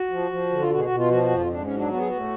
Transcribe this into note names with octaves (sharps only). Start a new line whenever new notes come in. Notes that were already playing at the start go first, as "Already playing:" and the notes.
Already playing: F#4
F3
F3
D3
F4
B2 F#4
G#4
F#4
B2
F4
F3 F#4
F#4
F2
F4
G#2 D4
C#4
F#3
D4
B3 F#4
G#4
A2 F#4